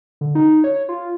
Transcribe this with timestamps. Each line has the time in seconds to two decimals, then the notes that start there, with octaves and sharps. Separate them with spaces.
0.21 D3
0.35 D#4
0.64 C#5
0.89 F4